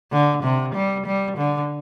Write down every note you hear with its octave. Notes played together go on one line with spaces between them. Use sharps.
D3
C3
G3
G3
D3